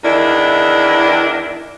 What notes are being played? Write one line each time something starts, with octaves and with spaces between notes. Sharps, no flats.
E2 D#3 D4 E4